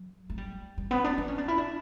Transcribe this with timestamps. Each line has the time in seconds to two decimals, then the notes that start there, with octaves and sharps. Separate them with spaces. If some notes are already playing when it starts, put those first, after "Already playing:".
Already playing: F#3
0.30 A3
0.38 G3
0.78 G3
0.91 B3
1.04 D4
1.18 D4
1.28 C#4
1.38 D4
1.48 E4
1.58 D4